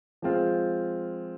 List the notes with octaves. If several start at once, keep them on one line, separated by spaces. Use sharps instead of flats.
F3 G#3 C4 F4